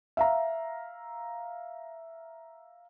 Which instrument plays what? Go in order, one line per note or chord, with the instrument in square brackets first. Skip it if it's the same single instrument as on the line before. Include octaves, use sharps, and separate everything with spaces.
[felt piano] E5 F5 A#5